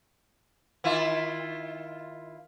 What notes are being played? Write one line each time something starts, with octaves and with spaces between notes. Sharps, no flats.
D#3 E4 F4